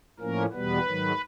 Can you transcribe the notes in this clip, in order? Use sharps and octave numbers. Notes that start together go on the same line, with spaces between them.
A2 F3 A#3 C#4 A#4
E2 B2 G3 B3 B4
G#2 D#3 F#3